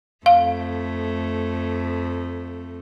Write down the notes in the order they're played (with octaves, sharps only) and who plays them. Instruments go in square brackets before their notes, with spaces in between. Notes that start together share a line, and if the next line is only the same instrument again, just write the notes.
[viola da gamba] F2 A3 [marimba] F5